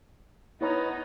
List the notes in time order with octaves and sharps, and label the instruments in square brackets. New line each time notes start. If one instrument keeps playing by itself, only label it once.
[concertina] B3 [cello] D#4 [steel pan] E4 C#5 A#5